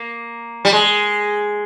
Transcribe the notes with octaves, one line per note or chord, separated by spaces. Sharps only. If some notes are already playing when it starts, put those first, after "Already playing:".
Already playing: A#3
G3
G#3